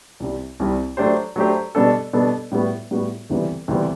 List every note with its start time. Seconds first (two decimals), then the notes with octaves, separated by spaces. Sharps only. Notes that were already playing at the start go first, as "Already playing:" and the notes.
0.20 C2 C3 G3
0.60 C2 C3 G3
0.97 F#3 A3 D4 G4 C5
1.36 F#3 A3 D4 G4 C5
1.75 B2 G3 B3 D4 A4
2.13 B2 G3 B3 D4 A4
2.52 A2 G3 B3 F#4
2.91 A2 G3 B3 F#4
3.30 D2 C3 E3 G3 B3
3.68 D2 C3 E3 G3 B3